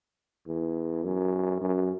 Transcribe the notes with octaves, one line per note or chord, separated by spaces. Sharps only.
E2
F#2
F#2